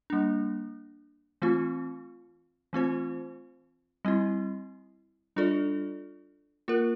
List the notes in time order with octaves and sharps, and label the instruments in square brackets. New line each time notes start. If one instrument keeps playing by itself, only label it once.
[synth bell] G3 A#3 D4
E3 A3 C4 F4
E3 A3 C4 F4 C5
G3 C4 E4
G3 D4 F4 A4 D5
A#3 F4 A#4